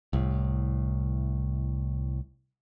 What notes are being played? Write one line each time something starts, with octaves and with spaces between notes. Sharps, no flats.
C2 A2